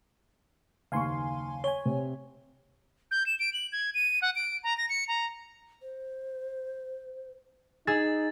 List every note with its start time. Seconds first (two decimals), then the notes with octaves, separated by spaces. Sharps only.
0.92 F#1 D#2 F5 G#5 C6 C#6
1.64 C#5 G#5 G7
1.86 C3
3.11 G6
3.26 E7
3.39 D7
3.53 F#7
3.72 G#6
3.94 D#7
4.22 F#5
4.36 D7
4.63 A#5
4.78 A#6
4.89 C#7
5.08 A#5
5.82 C5
7.87 D#4 G#4 E6 A6